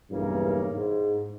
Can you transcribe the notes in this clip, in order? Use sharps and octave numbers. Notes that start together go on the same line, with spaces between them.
B1 E2 G2 C#3 A#3
G#2